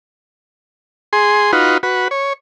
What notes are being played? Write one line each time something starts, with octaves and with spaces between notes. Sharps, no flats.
G#4 C6
D#4 F4 F#4 B4
F#4 B4
C#5